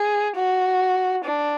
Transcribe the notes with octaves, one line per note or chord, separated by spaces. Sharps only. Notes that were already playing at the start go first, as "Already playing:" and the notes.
Already playing: G#4
F#4
D4